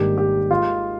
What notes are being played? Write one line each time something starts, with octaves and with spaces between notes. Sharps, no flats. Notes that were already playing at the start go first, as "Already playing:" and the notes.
Already playing: G#1 G#2 G3 A#3 D4 G4
G4
D#3 G#3 F4